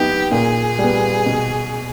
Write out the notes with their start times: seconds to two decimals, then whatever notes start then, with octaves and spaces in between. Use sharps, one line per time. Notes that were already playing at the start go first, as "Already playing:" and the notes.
Already playing: F#3 B3 D#4 G4
0.31 A#2 G#4
0.79 G3 B3
1.26 B2